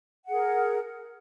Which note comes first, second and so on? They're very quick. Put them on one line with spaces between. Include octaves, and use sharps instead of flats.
F#5 G#4 A#4